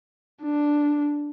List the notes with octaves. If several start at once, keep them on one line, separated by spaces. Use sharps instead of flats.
D4